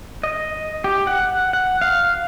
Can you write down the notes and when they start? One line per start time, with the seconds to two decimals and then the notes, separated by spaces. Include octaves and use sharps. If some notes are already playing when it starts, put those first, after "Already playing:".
0.23 D#5
0.84 G4
1.07 F#5
1.53 F#5
1.81 F5